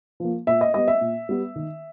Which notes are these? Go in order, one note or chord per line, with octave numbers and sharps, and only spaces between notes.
F3 A#3
A#2 E5
D#5
G3 B3 D#5
E5
A#2
G3 B3
D#3